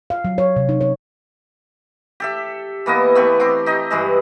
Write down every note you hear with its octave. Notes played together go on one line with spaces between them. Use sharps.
F5
F#3
C#5
C3
D#4
C#5
G4 A4 E5
E3 A#3 B3 D#5
A3 B3 G4 C#6
C4 C6 D6
D#4 G4 D#5
G2 E3 G#3 D#5